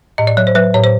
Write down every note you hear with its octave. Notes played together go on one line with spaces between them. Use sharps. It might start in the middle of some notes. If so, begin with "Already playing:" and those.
A2 D#5
D5
F#3 C#5
C5
F#3 B4
A2 C#5
C5